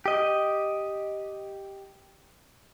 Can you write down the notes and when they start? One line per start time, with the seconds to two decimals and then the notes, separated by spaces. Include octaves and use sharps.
0.06 G4 D#5